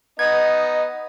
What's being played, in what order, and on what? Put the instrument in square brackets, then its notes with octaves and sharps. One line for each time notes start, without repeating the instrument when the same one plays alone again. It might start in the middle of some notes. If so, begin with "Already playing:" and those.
[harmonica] B3 D#4 [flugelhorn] D#5 [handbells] G#6